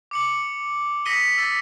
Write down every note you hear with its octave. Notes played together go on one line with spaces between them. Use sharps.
D6 C#7 F#7
D#6 A#6 B6 C#7 D#7 G7
E6 A6 B6